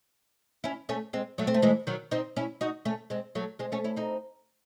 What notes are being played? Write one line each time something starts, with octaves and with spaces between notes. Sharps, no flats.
C#4 E4
A3 C#4
G#3 C4
F#3 A3
C4
A3
E3 G#3
D#3 F#3
C4 D#4
C#4 E4
D#4 F#4
A3 C#4
G#3 C4
F#3 A3
G#3 C4
A3 C#4
C#4 E4
C4 D#4